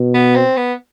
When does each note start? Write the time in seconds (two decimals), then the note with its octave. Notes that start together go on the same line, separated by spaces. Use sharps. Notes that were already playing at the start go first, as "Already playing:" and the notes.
Already playing: B2
0.14 B3
0.35 C4
0.57 B3